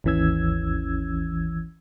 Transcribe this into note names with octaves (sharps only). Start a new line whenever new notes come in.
G#1 D#2 E3 C#4 E6 G#6